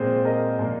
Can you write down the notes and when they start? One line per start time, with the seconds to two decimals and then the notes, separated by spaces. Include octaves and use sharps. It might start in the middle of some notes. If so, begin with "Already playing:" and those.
Already playing: A#2 G#3 C4 G#4 C5
0.25 A#4 D#5
0.59 A#2 A#3